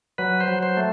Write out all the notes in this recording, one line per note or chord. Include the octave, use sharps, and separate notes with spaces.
F#3 B4
C5
F#3
C5
A3